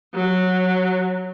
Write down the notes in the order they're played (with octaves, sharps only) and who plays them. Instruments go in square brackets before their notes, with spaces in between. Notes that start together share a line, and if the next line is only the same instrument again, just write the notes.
[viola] F#3